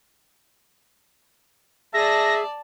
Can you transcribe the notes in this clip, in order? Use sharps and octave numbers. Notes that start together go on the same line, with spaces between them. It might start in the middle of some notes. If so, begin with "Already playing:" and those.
G#4 D5 E5 A5 A#6